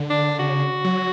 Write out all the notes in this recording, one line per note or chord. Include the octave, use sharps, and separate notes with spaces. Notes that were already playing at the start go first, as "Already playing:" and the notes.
Already playing: D3
D4
C#3 F#4
F#3